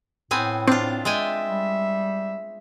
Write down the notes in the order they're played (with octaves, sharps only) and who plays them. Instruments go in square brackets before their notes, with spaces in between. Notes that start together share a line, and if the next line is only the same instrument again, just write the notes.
[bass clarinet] A2 [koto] B3 C4 G#5
[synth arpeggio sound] C4 [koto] D4 F4
[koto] G#3 G5 G#5 [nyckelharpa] E5
[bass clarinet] G3